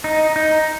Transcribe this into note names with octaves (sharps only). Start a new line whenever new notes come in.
D#4
D#4